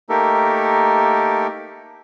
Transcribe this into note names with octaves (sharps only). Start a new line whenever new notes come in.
A3 A#3 D#4 G4 A4 A#4